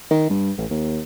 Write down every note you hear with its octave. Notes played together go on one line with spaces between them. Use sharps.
D#3
G2
A1
D#2